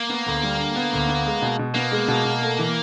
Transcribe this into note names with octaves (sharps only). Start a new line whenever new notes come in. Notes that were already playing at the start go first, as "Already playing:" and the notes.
Already playing: A#3
B3
D2
G3
D3
B3
D2
B3
G#3
B2
B2
A#3 B3
G#3
B2
B2
A3
E3